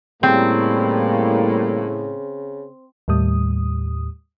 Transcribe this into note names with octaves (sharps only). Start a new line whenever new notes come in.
A2 C#3 G3 A#3 C4
D#2 A2 G3 D#6